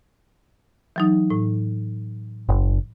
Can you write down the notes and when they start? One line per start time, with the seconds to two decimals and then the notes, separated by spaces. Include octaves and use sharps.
0.96 E3 F#3 D#4
1.30 A2
2.49 F#1